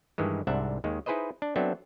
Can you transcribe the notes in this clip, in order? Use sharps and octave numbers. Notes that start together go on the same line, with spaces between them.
G2 D#3 E3 G#3
C2 G#2 C3 D4 E5 F#5
D#2 D#3 G#3
D#4 E4 G#4 B4 C5 D#5
D4
F#3 B3 C4 D4 A4 E5